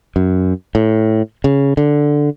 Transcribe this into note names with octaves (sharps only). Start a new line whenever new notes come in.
F#2
A2
C#3
D3